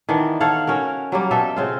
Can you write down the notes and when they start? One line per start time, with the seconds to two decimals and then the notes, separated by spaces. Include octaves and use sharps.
0.09 D#3 E3 B3 D4
0.40 A4 C#5 F5 F#5
0.67 C#4 F#4 A#4
1.12 F#3 G3 A#3
1.31 B2 A4 E5 G5
1.56 C#3 C4 F4